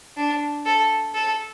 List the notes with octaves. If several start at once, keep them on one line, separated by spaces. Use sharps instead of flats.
D4
A4
A4